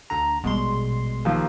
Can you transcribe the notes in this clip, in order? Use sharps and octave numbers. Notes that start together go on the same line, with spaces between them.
D2 D3 A#5
A#1 B2 G3 G#3 C6
D#2 F3